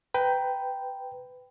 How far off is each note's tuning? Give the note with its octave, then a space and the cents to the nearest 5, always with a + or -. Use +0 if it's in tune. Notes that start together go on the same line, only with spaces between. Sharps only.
B4 +20 G5 +0 A#5 +20